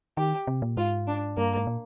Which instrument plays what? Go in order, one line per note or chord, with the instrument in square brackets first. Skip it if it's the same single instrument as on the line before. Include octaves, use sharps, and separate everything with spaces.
[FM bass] D#3 [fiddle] G4
[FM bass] C3
A#2
[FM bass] G#2 [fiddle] F4
[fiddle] D4
[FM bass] G2 [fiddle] A#3
[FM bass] G#2
A#2